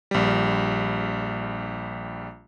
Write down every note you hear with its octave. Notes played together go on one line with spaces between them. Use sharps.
A#1 G3